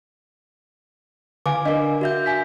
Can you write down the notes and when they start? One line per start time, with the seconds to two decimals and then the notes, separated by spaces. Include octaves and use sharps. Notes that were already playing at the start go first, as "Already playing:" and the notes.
1.46 D3 F5 G#5 D6
1.66 D4 A#4 D#5
2.01 F#4 E5 G6
2.26 G#5 B6